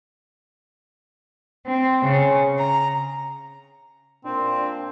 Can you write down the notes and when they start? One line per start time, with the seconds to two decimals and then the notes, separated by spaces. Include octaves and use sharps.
1.67 C4
2.05 C#3
2.58 A#5
4.25 A#2 C4 D4